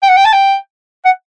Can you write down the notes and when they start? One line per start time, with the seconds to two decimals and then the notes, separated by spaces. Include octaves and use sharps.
0.03 G5
0.09 F#5
0.17 G5
0.25 A5
0.33 G5
1.05 F#5